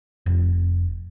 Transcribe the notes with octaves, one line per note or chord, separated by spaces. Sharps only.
F1